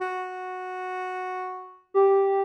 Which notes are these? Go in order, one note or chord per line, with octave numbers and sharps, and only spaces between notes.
F#4
G4